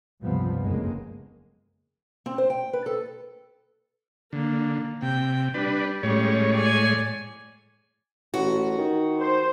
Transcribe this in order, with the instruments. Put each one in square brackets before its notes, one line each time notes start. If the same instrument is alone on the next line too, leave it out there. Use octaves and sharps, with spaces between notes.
[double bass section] C#2 G2 C3 F3 B3
F#1 F2 C#3 G#3 A#3
[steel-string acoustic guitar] C4
C5
G5
B4
A4
[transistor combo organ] D3 [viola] A#3
[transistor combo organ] C3 [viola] G5
[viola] G3 [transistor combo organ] D4 B4
[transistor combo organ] A2 G#3 C#5 [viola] G3 C#4
[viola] D5 G#5
[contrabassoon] A1 [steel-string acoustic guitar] F#4
[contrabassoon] D#3
[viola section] C5